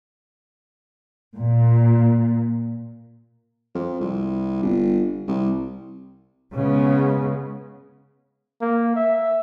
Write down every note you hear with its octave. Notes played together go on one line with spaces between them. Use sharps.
A#2
F2
C2
G1
C2
C#3 G#3 B3
A#3
E5